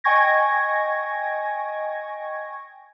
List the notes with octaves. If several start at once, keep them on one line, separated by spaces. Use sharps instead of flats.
D#5 G5 G#5 C#6 G#6 A#6